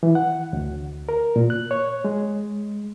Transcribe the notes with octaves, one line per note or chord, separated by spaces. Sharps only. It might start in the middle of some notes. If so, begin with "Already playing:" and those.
E3
F#5
D2
A#4
A#2
F#6
C#5
G#3